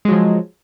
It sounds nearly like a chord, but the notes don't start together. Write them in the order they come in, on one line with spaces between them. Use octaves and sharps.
G#3 F#3 F3